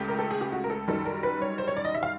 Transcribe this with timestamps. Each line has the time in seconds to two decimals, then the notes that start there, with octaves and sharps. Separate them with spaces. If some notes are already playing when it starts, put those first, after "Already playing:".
Already playing: C#2 C#3 A3 G4
0.08 A#4
0.19 A4
0.31 G#4
0.41 G4
0.52 F#4
0.64 A#4
0.70 A4
0.88 F#2 D#3 G3 A4
1.06 A#4
1.23 B4
1.42 C#5
1.58 C5
1.67 C#5
1.77 D5
1.85 D#5
1.95 E5
2.03 F5